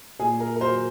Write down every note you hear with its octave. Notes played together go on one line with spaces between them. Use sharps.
A#2 G#4
A#4
A#4
F#3 C5